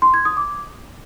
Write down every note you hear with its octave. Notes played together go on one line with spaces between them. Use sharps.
C6
G#6
D#6
D6